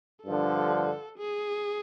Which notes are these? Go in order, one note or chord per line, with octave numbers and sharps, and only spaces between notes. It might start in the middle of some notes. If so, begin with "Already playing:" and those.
G2 D3 F3 A4
G#4